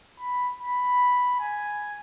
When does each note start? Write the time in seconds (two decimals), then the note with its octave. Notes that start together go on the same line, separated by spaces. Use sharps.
0.20 B5
0.62 B5
1.40 G#5